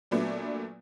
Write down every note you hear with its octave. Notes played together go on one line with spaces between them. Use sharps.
A#2 F#3 A3 B3 D4